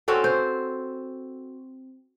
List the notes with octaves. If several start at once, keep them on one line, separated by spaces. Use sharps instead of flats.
C4 C#4 F#4 A4
C5